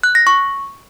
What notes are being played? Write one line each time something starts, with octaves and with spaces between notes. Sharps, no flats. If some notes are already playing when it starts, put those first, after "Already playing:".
F#6
A#6
C#6